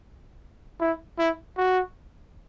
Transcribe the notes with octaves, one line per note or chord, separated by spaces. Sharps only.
E4
E4
F#4